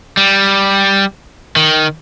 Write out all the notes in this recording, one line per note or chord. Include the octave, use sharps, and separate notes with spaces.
G3
D#3